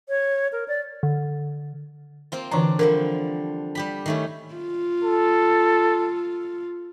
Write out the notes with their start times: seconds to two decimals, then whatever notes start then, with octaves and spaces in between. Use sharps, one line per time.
0.09 C#5
0.52 A#4
0.68 D5
1.03 D3
2.32 A#3 C4 F4
2.51 D3 E3 D4 A#5
2.79 D3 F3 G3 A#4
3.75 G3 G4 B5
4.06 D#3 A3 C#4
4.54 F4
5.04 A4